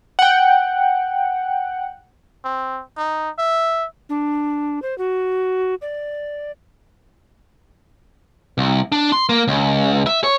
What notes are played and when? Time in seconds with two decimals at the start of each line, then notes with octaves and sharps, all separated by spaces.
0.19 F#5 G5
2.44 C4
2.97 D#4
3.39 E5
4.09 D4
4.82 C5
4.98 F#4
5.82 D5
8.58 C2
8.92 D4
9.12 C6
9.29 A#3
9.48 C#2
10.07 E5
10.24 C#5